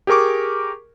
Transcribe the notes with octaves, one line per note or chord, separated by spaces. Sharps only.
G4 G#4 A#4 C#6 D6